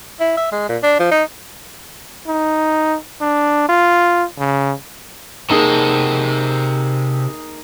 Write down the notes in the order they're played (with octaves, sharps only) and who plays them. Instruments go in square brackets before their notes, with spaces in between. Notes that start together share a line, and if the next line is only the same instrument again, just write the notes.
[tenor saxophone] E4
E5
G#3
A#2
D4
F3
D#4
[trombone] D#4
D4
F4
C#3
[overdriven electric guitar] C3 A4 [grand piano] A#3 D#4 G#4